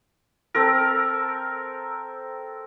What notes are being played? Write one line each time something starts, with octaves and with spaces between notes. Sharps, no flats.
C4 A4 A#4